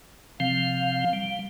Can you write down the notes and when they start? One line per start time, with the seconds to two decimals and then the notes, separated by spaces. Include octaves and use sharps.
0.40 C3 F3 C4 F5
1.13 G3